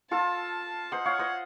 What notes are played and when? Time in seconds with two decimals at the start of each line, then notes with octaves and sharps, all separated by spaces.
0.11 F4 A4 A5
0.91 C5 D#5 F#5
1.05 C#5 F5
1.19 C5 D#5